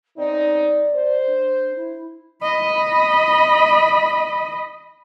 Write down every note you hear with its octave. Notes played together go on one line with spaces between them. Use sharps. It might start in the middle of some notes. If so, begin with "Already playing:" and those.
C#3 C4 D#4 D5
C5
D4
E4
D#5 B5